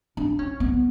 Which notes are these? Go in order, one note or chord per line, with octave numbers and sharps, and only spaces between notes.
D4
C#4
B3